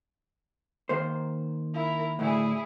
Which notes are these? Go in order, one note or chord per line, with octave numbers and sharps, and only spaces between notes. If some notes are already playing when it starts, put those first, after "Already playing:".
D#3 A#3 C5
E4 A#4
D2 A2 E4 G#4